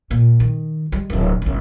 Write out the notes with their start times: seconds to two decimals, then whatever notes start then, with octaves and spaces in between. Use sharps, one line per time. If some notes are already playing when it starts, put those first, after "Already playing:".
0.11 A#2
0.40 D#3
0.92 G3 G#3
1.10 D1 C3
1.42 G1 C#3